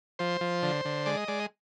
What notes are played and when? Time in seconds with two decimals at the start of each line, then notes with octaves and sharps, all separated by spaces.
0.19 F3 C5
0.41 F3
0.63 D3
0.85 D3
1.06 G#3 D5
1.17 D#5
1.28 G#3 D5
1.40 D#5